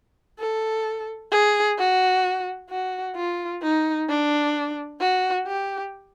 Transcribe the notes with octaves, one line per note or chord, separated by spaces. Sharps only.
A4
G#4
F#4
F#4
F4
D#4
D4
F#4
G4